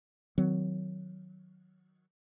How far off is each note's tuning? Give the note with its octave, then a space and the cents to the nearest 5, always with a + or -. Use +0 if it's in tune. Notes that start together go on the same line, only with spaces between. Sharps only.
D#3 +0 F#3 +0 C4 -35